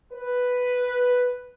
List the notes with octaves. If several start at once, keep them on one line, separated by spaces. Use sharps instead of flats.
B4